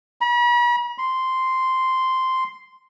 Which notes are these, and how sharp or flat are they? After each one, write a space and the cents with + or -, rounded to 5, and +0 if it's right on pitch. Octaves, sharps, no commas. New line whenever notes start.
B5 -45
C6 -5